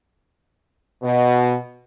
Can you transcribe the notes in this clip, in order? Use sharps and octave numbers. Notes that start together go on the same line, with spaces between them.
B2